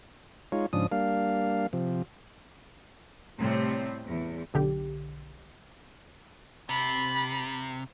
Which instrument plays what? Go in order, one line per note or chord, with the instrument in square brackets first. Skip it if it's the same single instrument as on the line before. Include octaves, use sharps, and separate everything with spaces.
[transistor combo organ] G#3 D#4 F4 C#5
G#2 C#3 F3 D4 D#6
G3 A#3 D4 F5
C3 F3
[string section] A2 C3 G3 C4
E2
[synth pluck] B1 D3 G4
[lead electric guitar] C3 [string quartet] B5 A6